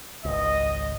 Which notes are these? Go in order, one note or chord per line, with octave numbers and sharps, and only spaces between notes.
G#1 C#2 D#5